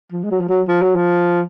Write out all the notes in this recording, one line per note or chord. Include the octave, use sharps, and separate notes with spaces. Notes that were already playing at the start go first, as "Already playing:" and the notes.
F3
G#3
F#3
F3
F#3
F3
F#3
F3